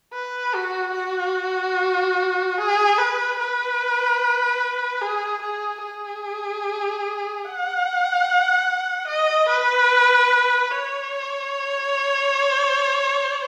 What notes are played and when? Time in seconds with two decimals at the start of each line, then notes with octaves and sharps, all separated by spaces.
0.13 B4
0.54 F#4
0.94 F#4
2.58 G#4
2.98 B4
3.39 B4
5.02 G#4
5.42 G#4
5.82 G#4
7.45 F#5
9.08 D#5
9.49 B4
10.71 C#5